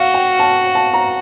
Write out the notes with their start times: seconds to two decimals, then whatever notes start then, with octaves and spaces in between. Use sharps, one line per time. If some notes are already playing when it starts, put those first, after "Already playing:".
Already playing: F#4 F5
0.14 G5
0.40 A5
0.75 A5
0.94 A#5